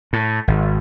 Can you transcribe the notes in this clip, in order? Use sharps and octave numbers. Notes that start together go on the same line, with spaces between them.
A2
G#1